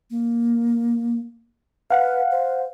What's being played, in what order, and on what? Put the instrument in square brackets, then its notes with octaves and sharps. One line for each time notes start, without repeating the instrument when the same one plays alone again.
[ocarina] A#3
[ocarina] B4 [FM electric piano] F5 F#5
[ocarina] C5